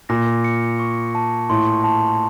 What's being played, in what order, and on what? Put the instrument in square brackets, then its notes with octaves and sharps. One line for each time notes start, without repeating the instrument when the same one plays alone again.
[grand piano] A#2 [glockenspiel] A#6
[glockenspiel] C#7
C#6
A5
[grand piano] A2 [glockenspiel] C6
[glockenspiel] A5